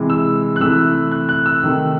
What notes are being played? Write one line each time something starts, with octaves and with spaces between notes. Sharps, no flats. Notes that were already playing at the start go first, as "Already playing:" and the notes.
Already playing: C3 E3 G#3
E6
F#6
C3 E3 A3 E6
F#6
F#6
E6
C3 D#3 A3